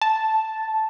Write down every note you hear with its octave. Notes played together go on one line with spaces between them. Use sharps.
A5